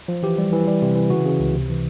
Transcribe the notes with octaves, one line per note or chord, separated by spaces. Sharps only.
F3
E3 G4
G3
E3
G3
C3
E3
C#3 F#4
C#3
C#2
C3
E3